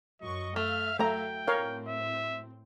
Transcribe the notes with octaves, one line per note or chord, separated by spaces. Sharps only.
F#2 F#3 D#5 C#6
A3 E5 F5 F6
F#3 A3 G5 A#5
A2 C4 A#4 C#5 F5
E5